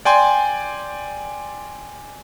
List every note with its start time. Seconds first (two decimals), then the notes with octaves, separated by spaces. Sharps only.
0.05 D5 G5 G#5 C6